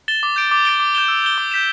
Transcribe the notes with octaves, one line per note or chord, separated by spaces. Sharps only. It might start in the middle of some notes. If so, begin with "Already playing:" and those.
A6 E7 G7
D6
G6 D7
D6
A6 D7 G7
D6
G6 E7 G7
E6
G6 E7 G7
D6
G6 B6 E7